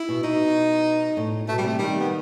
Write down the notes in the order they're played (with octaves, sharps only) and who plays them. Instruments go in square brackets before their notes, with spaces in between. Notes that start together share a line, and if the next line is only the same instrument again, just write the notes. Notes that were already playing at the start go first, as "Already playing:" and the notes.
Already playing: [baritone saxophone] E4
[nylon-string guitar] B2
[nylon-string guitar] B2 [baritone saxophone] D#4
[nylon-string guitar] A2
[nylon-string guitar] B2 [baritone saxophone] A3
[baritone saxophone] G3
[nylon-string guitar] C3 [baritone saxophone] A3
[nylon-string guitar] D#3 [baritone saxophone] G3
[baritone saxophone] B3